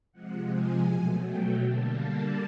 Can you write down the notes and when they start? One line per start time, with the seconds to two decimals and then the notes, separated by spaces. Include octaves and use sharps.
0.12 C3 F3 G#3 F#5
0.50 G#5
0.87 B2 F#3 A3
1.24 G5
1.62 D3 G3 A#3 A5
1.99 A5